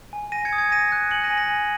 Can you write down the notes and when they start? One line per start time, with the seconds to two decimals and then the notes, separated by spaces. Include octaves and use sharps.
0.13 G#5
0.32 G#5 A#6 D#7
0.45 G#6 C#7
0.53 D#6
0.58 G#6 C#7
0.71 G#5 A#6 D#7
0.92 F#6
1.11 G#5 C#7 F#7
1.24 A#6 D#7
1.30 G#5
1.37 A#6 D#7
1.50 G#5